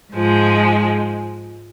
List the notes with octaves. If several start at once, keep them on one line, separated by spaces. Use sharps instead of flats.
G#2 F3 G#3